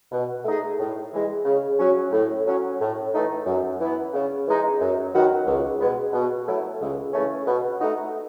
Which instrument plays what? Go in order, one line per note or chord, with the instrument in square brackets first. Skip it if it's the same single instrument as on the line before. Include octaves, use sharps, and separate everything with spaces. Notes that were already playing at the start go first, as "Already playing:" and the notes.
[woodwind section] B2
A3 D#4 G#4
A2
E3 G#3
C#3
F#3 C#4
A2
F#3 C#4
A2
E3 A3 D#4
F#2
E3 B3
C#3
E3 G#3 D#4
F#2
D#3 F#3 B3 F#4
C#2
B2 G#3 B3
B2
F#3 A3 E4
C#2
C#3 E3 A3 C#4
B2
A3 D#4 F#4